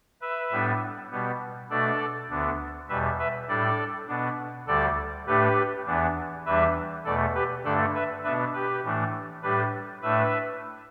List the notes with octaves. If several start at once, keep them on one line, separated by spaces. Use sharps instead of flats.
B4 E5
A2 G3 B3 D4
B2 G3 B3
B2 A3 D4 A4 D5
D2 D3 B3 D4
E2 B2 G3 B4 E5
B4 E5
A2 G3 D4 A4 D5
B2 B3 D4
D2 D3 G3 A4 D5
A2 A3 D4 G4 B4
E2 E3 B3 D4
E2 E3 G3 D4 B4 E5
E2 B2 A3 A4 D5
G4 B4
G2 D3 A3 D4 A4 D5
B4 E5
B2 B3 D4 B4 E5
G4 B4
A2 E3 A3 D4
A2 G3 D4 G4 B4
A2 A3 D4 B4 E5